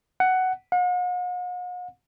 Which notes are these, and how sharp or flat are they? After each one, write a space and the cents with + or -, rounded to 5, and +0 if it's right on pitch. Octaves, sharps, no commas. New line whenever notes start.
F#5 +10
F#5 -45